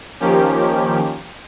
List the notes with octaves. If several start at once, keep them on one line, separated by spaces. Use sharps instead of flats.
D#3 F3 A#3 C#4 G4